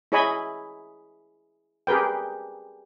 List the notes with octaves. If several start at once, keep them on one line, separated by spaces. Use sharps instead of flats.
E4 G#4 C#5 D#5 G#5 B5
G4 G#4 A#4 B4 G5